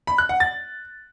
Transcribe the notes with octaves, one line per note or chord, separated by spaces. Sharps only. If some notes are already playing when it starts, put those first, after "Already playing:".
B5
F#6
F#5
A6